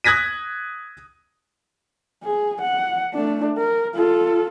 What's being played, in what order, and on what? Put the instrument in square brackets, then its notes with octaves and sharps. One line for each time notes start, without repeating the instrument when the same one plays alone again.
[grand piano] D#6 F#6 G#6 A#6 B6 D#7
[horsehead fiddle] G#4
F#5
A3 D4
A#4
F4 A4